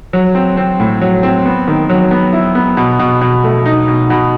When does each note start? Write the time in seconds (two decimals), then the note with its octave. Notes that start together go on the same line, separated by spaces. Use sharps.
0.13 F#3
0.35 C4
0.57 C4
0.80 A2
1.01 F#3
1.23 C4
1.45 B3
1.68 D#3
1.89 F#3
2.11 B3
2.33 E4
2.55 B3
2.77 B2
2.99 B2
3.21 B2
3.44 A3
3.66 D#4
3.88 B2
4.10 B2